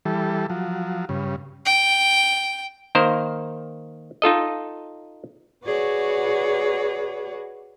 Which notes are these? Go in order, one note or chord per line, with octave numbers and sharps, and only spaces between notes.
E3 G3 A4
F3 F#3
G2 C#3
G5
D#3 A#3 A#4 C5
D#4 F4 A4 D#5
F#4 G#4 B4 C#5 D5